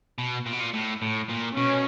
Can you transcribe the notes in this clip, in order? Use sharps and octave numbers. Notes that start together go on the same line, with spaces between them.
B2
A#2
B2
A#2
A2
A2
A#2
B2 C#4